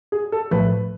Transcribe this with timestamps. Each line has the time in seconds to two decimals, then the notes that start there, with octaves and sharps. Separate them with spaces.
0.12 G#4
0.32 A4
0.51 B1 A2 F3 A3 B4